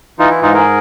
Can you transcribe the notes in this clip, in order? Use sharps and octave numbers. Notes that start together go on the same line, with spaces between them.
E3 D#4 F4
E4
G#2 D#4 F4
G#4 A#4